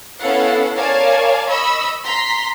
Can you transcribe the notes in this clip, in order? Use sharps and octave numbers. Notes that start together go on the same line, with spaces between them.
B3 C#4 E4 A4 F5 F#5
A#4 C#5 D5 F5 G#5 A5
D#5 B5 C#6 E6
A#5 C6 B6